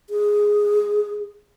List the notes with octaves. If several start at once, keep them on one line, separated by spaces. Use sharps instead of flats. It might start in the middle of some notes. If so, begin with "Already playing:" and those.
G#4